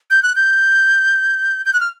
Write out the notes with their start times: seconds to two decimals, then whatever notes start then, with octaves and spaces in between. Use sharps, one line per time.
0.11 G6
0.23 F#6
0.36 G6
1.66 G6
1.73 F#6
1.80 F6